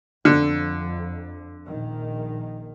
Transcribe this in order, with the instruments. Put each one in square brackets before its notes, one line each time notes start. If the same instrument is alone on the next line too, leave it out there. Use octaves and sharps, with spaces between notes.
[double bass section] F2 [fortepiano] D3
[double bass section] A#1 D#3